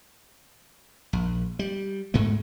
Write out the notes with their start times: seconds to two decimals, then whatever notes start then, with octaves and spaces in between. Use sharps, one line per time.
1.13 A#1
1.59 G3
2.14 G#2 G#3 A3